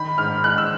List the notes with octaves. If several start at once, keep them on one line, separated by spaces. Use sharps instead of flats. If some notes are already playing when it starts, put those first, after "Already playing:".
Already playing: D#3 B5
G#2 F6
G#3 F#6
E6